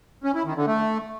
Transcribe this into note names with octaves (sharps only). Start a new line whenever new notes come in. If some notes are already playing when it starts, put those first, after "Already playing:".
C#4
E4
D#3
D3
A3